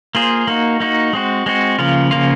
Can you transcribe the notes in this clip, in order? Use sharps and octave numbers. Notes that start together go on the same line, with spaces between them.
A#3 F4 G#4 C5
A#3 D#4 F#4
A#3 D#4 F#4
G#3 C4 F#4
G#3 C4 F#4
C#3 F3 A#3 F4
C#3 F3 A#3 F4